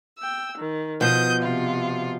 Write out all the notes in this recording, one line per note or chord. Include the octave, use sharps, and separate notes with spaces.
G5 E6
D#3
B2 F3 D#6 G6
C3 F4